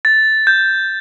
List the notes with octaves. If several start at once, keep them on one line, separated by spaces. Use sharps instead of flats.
A6
G6